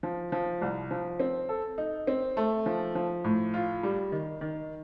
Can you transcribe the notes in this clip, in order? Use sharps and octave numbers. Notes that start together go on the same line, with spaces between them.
F3
F3
C2
F3
C4
A4
D#4
C4
A3
F3
F3
A2
F4
G3
D#3
D#3